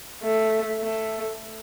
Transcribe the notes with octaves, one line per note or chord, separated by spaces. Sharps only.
A3
A3